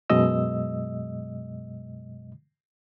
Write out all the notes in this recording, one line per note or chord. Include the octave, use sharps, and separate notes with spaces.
F#2 B2 F#3 G#3 D#5 E6